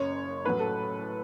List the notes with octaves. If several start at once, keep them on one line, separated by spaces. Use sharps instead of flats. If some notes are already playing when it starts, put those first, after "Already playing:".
Already playing: F#1 F#2 C#3 C#5
A1 A2 F#3 B4
A4